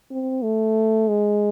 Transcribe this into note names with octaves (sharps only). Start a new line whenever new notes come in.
C4
A3
G#3